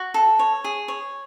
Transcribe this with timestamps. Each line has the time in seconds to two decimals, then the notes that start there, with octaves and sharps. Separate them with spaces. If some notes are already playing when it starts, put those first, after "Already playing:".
Already playing: F#4
0.14 A4
0.39 C#5
0.64 G#4
0.88 C#5